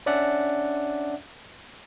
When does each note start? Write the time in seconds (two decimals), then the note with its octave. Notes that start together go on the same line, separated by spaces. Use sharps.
0.06 C#4 D4 D5 E5 F#5